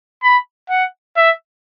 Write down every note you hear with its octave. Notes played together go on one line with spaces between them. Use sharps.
B5
F#5
E5